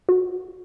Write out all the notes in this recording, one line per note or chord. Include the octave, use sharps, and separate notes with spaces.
F#4